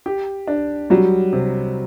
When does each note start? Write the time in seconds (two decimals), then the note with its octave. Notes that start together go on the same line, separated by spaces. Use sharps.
0.06 G4
0.48 D4
0.90 F#3 G3
1.33 C3